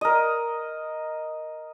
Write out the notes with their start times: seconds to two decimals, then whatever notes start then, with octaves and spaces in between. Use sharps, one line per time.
0.01 A#4 D#5